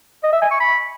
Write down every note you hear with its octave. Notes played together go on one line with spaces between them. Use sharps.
D#5
E5
G#5
C#6
B5